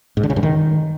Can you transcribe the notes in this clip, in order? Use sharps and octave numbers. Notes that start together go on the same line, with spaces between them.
G#2
D3
C#3
G2
D#3